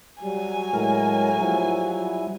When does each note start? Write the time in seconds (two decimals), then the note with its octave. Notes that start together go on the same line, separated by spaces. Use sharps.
0.23 F#3 G3 G#5
0.74 A2 G#3 A#4
1.41 F3 G3 E4